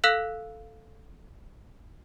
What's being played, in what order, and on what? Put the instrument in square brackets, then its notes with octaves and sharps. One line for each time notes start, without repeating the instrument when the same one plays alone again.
[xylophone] A4 F5 E6 F#6 B6 F#7